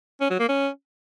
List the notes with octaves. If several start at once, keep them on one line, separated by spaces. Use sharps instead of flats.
C#4
F#3
A#3
C#4